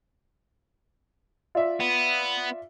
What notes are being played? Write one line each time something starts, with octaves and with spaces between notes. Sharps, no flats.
F4 D5 E5
B3